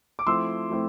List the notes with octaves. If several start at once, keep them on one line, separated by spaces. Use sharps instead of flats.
D6
F3 A3 C4 E4 C6 E6
F3 A3 C4 E4